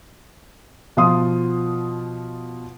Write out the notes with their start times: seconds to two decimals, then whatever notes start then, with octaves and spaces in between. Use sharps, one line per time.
0.97 B2 F3 F4 F5 C6 D#6